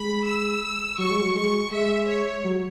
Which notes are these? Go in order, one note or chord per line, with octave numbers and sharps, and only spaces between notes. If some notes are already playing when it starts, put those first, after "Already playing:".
Already playing: G#3 B5
E6
F#3 C#6
G#3
F#3
G#3 C#6
G#3 E5
C#5
F#3